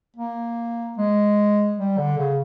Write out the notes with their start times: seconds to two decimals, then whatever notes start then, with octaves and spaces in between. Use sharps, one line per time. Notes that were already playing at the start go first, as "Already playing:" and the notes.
0.17 A#3
0.98 G#3
1.78 G3
1.98 D3
2.18 C#3